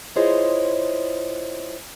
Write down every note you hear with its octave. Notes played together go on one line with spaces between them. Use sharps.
E4 F4 G#4 C5 C#5 D#5